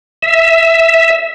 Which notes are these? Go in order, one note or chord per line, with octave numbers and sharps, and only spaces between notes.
E5